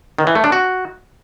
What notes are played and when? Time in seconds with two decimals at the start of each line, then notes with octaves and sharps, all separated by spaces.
0.19 D#3
0.27 E3
0.35 A3
0.44 D4
0.52 F#4